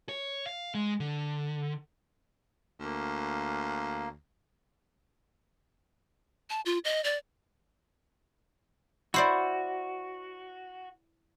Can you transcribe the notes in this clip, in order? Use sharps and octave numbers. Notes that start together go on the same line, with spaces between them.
C#5
F5
G#3
D3
D2 A#3
A5
F4
D#5
D5
E4 F#4 C5 D5